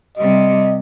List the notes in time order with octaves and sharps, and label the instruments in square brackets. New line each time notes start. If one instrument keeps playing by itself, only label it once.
[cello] C3 G3 [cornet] D#5